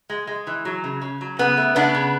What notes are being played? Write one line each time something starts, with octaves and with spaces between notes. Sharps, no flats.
G#3
G#3
E3
F#3
C#3
C#3
F#3
C#3 B3
A3
C#3 B3 D4
C#3